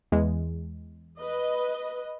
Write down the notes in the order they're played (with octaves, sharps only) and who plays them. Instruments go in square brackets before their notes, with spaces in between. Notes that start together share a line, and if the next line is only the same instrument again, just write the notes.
[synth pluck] E2 G#3
[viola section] B4 D#5